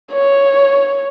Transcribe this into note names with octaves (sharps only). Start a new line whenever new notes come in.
C#5